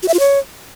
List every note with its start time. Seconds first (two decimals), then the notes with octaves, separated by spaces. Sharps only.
0.03 F#4
0.08 E5
0.14 F4
0.19 C#5